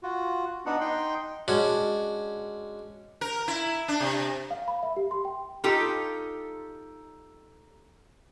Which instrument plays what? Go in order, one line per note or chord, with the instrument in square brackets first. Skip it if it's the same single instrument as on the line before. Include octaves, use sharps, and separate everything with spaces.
[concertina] F4 F#4
B3 D4 D#4 F#5
D#4 G5 C6
[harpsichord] G#3 C#4 D4 F#4
[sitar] A#4
E4
D4
C3
[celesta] F5
B5
E5
G4
C6
G5
[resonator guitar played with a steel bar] D#4 F4 G4 A4